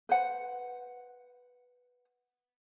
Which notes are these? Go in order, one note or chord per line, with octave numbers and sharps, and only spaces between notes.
B4 C5 F#5